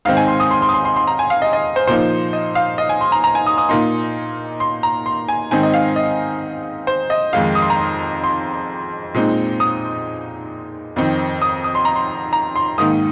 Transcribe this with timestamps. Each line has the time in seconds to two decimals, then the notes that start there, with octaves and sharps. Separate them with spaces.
0.05 G#2 D#3 C4 D#4 F5
0.17 G#5
0.28 C6
0.40 D#6
0.51 C6
0.62 C6
0.69 D#6
0.74 C6
0.85 C6
0.96 C6
1.07 A#5
1.19 G#5
1.30 F5
1.42 D#5
1.53 D#5
1.76 C5
1.87 A#2 F3 A#3 D#4 C5
2.33 D#5
2.55 F5
2.78 D#5
2.89 G#5
3.01 C6
3.12 A#5
3.24 A#5
3.35 G#5
3.46 D#6
3.58 D#6
3.69 A#2 A#3 D#4 C6
4.60 C6
4.83 A#5
5.06 C6
5.28 G#5
5.51 G#2 D#3 C4 D#4 G#5
5.63 D#5
5.74 F5
5.96 D#5
6.87 C5
7.10 D#5
7.33 F2 D#3 G#3 D#4 F5
7.55 D#6
7.62 C6
7.70 A#5
7.77 C6
8.24 C6
9.14 A#2 G#3 C4 D#4
9.60 D#6
10.96 F2 D#3 C4 D#4
11.42 D#6
11.64 D#6
11.75 C6
11.85 A#5
11.96 C6
12.33 A#5
12.56 C6
12.78 G#2 D#3 A#3 D#4 D#6